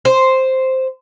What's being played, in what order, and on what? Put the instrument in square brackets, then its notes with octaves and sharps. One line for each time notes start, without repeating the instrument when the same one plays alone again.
[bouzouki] C5